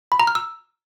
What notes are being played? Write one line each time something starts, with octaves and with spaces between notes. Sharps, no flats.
B5
A#5
F6
E6